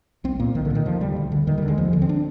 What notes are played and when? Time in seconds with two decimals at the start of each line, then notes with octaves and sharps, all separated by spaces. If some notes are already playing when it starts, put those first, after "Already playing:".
0.24 C2 C4
0.39 A#2 A#3
0.55 C2 D#3
0.65 D3
0.70 A#2 D#3
0.85 D#2 F3
1.01 D3 G3
1.16 D2
1.32 D3
1.47 D#2 D#3
1.58 G3
1.63 D3
1.68 G#3
1.78 D#2 F3
1.93 D3
2.02 C4
2.09 D4